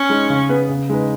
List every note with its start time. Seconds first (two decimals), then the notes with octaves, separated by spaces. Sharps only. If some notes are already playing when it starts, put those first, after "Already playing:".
Already playing: C#4
0.10 G#3 D#4
0.30 C#3
0.49 B3 G#4 B4
0.69 C#3
0.90 G#3 D#4 B4